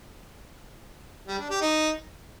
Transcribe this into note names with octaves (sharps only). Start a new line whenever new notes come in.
G3
D4
G4
D#4